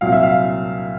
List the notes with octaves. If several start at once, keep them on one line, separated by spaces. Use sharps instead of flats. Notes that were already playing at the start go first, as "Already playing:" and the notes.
C2 A#2 F#3 F5
E5
F5